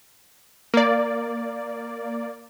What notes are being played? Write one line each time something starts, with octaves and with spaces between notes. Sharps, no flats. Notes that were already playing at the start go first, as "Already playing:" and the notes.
A#3 D5